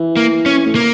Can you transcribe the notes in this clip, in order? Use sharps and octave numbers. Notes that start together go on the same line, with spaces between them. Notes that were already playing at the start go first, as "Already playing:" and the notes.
Already playing: E3
A#3
C#4
A2
A#3